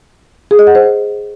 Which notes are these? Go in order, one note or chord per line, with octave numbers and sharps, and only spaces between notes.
G#4
D#5
F#5
C5